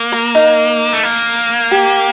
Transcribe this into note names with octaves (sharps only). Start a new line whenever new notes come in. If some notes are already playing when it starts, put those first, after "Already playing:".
Already playing: A#3
A#4
D#4
A3
A#3
G4